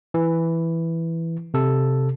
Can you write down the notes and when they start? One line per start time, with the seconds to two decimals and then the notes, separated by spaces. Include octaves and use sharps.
0.14 E3
1.54 C3 A4